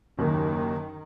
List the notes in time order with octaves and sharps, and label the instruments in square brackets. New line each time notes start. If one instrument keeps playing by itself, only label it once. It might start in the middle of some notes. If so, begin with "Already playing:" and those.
[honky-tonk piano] F#1 D#2 [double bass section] D#3